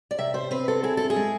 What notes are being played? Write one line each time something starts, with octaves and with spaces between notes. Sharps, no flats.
D5
C3 E5
C5
C4 B4
A4
E4 G#4
A4
G#4
G#3